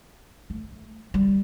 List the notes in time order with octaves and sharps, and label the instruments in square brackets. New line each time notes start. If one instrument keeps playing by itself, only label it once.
[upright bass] A3
G3